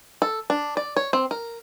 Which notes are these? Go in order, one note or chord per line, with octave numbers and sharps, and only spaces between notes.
A4
D4
D5
C#5
C4
A#4